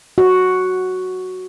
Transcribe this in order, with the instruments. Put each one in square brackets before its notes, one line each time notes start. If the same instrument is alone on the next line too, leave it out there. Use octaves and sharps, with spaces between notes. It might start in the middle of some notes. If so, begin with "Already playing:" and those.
[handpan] F#4